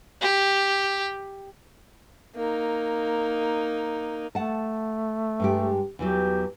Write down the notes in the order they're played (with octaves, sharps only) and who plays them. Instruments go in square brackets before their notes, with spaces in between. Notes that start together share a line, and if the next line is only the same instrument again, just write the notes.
[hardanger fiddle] G4
[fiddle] A#3 D#4
[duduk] A3 [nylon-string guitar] F#5 A5
[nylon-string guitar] G2 G#3 G4
[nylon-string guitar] E2 E3 F#3 [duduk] G4